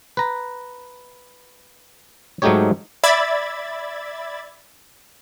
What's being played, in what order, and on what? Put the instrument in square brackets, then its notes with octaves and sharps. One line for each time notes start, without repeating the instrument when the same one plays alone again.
[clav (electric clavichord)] B4 A#5
G#2 F#3 A3 D#4 G4 C#5
[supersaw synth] D5 E5 B5 G#6 A6